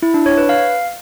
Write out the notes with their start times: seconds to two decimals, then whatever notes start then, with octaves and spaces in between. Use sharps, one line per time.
0.02 E4
0.14 D4
0.26 C#5
0.38 B4
0.49 F5